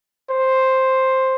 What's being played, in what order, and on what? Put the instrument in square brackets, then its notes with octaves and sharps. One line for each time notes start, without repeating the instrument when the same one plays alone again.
[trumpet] C5